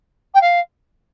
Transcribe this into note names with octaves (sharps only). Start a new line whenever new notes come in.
G5
F5